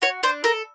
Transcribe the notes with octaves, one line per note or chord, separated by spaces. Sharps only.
F#4 C#5
D4 C5
A4 A#4